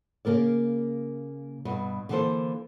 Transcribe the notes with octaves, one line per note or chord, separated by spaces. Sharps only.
C#3 A#3 A#4 D5
G2 B2
D3 E3 A#3 B3 A4 C5